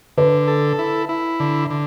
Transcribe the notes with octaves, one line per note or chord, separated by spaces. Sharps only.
D3 B4
A4
E4
E4
D3
D3